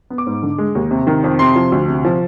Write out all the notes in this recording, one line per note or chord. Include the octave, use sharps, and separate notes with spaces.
B3
D6
G#2
D3
G#3
D#2
C3
D#3
F2
C3 C6
F3
D2
C3
F3